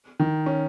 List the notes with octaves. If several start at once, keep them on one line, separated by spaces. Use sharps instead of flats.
D#3
C#4